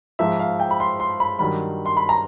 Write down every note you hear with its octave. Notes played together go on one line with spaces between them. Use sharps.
G#2 F3 E5
F5
G5
B5
C6
C6
B5
G2 D#3 F#3 B5
C6
B5
A#5